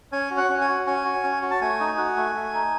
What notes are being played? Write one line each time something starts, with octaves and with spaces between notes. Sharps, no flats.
C#4 G#5
F#4
F#5
C#4
G#5
F#4
C#4 G#5
F#4
C#4
F#4
A5
A3 G#5
D#4
F#4
A3
A3
D#4